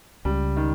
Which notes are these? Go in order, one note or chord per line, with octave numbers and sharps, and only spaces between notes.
C#2 C#3 G3
D#3